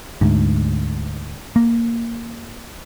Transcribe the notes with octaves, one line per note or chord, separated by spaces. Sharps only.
D2 G#2
A#3